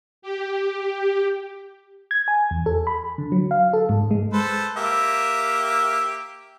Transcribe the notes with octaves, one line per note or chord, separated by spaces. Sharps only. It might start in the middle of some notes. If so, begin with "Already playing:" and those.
G4
G#6
G#5
E2
A4
B5
D3
F#3
F5
A4
G#2
G#3
A4 B4 C5
A#3 G4 E5